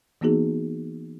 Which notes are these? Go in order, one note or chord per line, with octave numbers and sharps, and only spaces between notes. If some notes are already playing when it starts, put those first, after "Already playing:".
E3 A#3 B3 D#4 F#4 G#4